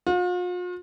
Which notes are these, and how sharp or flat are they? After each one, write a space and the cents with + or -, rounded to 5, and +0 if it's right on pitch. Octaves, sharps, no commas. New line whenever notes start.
F4 +45